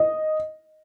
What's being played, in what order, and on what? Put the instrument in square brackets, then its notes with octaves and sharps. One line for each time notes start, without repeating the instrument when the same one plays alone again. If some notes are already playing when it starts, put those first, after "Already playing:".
Already playing: [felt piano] D#5